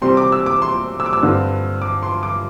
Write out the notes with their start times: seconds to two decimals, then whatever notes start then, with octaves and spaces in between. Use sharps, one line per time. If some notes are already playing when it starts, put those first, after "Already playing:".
0.02 C3 G3 C4 C6
0.17 D6
0.32 E6
0.46 D6
0.62 C6
1.00 E6
1.06 D6
1.13 E6
1.23 G2 D3 C4
1.82 D6
2.03 C6
2.23 D6